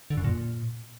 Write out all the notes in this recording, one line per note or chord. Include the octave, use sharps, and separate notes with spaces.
D3
F#2
A#2